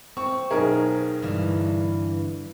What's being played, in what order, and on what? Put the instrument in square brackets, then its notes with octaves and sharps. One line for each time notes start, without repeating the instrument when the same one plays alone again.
[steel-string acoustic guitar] C4 [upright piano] C#6
[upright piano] B1 G#4 A#4
[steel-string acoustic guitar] G2 D3 E3